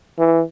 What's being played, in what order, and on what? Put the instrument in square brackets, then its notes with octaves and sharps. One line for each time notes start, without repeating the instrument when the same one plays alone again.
[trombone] E3